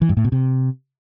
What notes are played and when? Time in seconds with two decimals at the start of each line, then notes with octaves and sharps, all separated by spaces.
0.02 E3
0.09 G2
0.17 A2
0.24 B2
0.32 C3